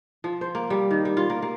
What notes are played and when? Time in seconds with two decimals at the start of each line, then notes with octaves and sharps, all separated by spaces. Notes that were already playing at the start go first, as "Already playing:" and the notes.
0.24 F3
0.41 C5
0.55 A#3
0.70 G3
0.91 D#3
1.05 G3
1.17 F4
1.30 A#3
1.42 A#3